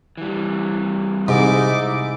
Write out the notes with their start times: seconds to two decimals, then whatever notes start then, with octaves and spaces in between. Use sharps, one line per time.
0.17 E3 G3
1.28 G#2 C3 D#4 E4 D6